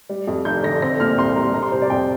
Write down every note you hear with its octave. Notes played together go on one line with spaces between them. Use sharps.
G3
F2
F1 G6
D3 A#6
C4 A#6
A#2 F6
C2 C6
G3 A#5
D4 A#5
C6
C3 C5
D5
F2 G5